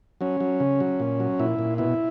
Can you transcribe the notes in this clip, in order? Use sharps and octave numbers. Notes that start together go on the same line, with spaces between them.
F#3 C#4
F#3
C#3
F#3
A#2
F#3
A#2 E4
A#2
B2 E4